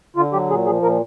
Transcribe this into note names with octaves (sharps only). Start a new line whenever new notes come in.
D3 F4
F#3 G4
A#2 G#4
F3 G#4
A#2 A#4